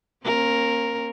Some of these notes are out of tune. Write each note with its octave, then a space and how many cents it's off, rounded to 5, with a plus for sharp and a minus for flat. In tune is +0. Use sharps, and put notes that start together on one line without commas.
A#3 +5 C#4 -40 A#4 +0